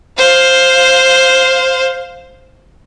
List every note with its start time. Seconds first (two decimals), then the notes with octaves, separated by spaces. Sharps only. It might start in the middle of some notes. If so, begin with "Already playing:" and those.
0.18 C5 F5